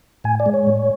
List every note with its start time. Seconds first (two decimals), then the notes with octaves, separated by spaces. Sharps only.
0.24 A2 G#5
0.40 D5
0.46 G#3
0.54 C#5
0.67 A2